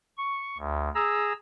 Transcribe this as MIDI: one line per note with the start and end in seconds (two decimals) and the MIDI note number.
0.18 0.57 85
0.58 0.89 38
0.95 1.33 68
0.95 1.33 82
0.95 1.33 88